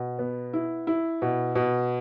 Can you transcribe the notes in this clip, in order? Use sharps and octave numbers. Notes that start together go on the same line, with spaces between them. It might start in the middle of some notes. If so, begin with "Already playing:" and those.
Already playing: B2
B3
E4
E4
B2
B2